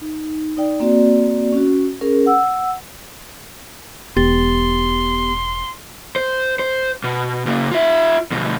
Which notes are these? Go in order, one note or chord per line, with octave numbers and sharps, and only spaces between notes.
D#4
D#4 D5 G5
A#3 C4 F#4 D5
C#4 F#4
C#4 G#4 A#4
F#5 E6
E1 B3 G4 C6 A6
C5
C5
B2
C#3 A#3
F4 E5
D2 B2